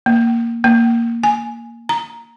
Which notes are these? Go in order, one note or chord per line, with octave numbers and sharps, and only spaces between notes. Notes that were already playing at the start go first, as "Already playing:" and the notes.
A#3
A#3
G#5
A#5